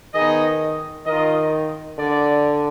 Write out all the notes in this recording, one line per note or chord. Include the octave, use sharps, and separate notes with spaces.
D#3 B3 D#4 G#4 D#5
D#3 F4 A#4 D#5
D3 D5